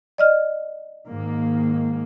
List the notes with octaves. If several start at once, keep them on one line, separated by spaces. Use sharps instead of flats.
D5 D#5 F6
G#2 D#3 A#3